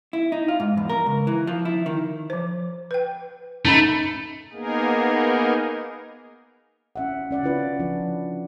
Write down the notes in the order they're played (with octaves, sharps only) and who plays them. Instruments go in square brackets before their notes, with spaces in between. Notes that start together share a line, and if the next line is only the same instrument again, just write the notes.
[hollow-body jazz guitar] E4
D#4
F4
G#2
E2
A#4
C#2
E3
F3
E4
D#3
[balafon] F3 C5
B4 G5
[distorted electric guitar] A3 [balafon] C#4 [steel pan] D#4 A#5 B5
[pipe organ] A#3 B3 D#4 G#4 A#4
[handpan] C#4 E5 F#5
C#4 D5 F#5
C#4 E4 F4 B4 D5
F3 D4